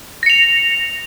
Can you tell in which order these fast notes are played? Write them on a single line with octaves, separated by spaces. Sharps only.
A#6 C#7 F7